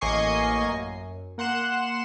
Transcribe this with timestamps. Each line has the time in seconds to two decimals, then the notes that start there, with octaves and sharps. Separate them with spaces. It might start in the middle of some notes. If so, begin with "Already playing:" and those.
0.01 A1 A#3 D#5 G#5 C#6 C7
0.65 F#2
1.38 A#3 F#5 C6 F#6 E7